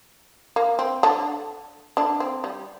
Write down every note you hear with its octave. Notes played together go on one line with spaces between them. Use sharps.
A#3
C4
D3 D4
D3 D4
C4
G3